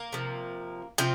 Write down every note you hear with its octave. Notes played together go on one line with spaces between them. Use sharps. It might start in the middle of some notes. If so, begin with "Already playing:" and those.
Already playing: A#3
C3 F3
C3 F3 C4